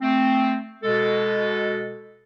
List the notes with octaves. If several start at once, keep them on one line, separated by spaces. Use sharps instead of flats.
A3 C4
B2 G#3 A4